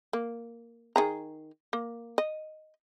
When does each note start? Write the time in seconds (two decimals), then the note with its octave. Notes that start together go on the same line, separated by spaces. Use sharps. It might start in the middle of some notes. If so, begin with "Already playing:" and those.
0.13 A#3
0.96 D#3 G#4 A#5
1.73 A#3
2.18 D#5